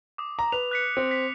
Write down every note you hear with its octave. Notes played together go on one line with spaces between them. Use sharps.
D6 D#6
A#5
B4 F7
F#6 B6 C#7
C4
B6